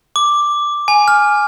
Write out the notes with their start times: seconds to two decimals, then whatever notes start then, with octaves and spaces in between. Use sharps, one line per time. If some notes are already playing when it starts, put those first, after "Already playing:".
0.16 D6
0.88 G#5
1.08 F6